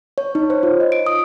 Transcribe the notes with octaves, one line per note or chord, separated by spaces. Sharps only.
C#5
D#4
C5
F4
D#5
D7
D#6